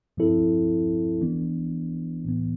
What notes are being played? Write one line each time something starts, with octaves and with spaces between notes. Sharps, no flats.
G2 F3 C4 E4 A4
E3 B3 D4
A2 E3 B3